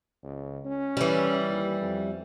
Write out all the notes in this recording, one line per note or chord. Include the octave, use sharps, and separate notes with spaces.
C#2
C#4
E3 G3
D#2
F2